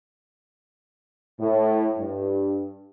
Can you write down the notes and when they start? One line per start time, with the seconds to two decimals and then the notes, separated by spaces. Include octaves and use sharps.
1.40 A2
1.98 G2